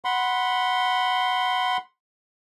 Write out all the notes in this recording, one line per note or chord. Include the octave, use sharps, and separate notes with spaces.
F#5 B5 C6